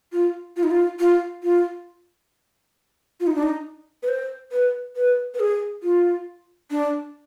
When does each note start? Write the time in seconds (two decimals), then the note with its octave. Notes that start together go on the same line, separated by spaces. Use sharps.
0.13 F4
0.57 F4
0.63 D#4
0.71 F4
1.00 F4
1.43 F4
3.20 F4
3.27 D#4
3.36 D4
3.43 D#4
4.03 B4
4.08 C5
4.52 B4
4.96 B4
5.34 B4
5.40 G#4
5.83 F4
6.71 D4